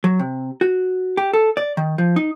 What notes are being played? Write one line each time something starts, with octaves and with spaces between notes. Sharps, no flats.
F#3
C3
F#4
G4
A4
D5
D#3
F3
D#4